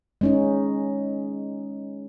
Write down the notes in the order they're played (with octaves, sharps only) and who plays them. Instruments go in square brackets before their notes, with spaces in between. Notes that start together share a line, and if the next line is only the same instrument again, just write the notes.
[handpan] G#3 C#4 D#4